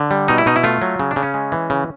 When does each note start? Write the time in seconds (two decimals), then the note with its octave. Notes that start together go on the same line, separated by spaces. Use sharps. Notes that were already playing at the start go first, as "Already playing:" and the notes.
Already playing: D3
0.11 G3
0.28 B2 D#4
0.38 E4
0.46 B2 D#4
0.56 E4
0.64 A3 F4
0.82 F#3
0.99 C#3
1.11 D4
1.16 C#3
1.23 C#4
1.34 G#3
1.52 E3
1.70 C#3